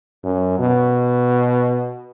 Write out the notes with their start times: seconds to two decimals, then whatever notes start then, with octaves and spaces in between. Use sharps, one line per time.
0.24 F#2
0.59 B2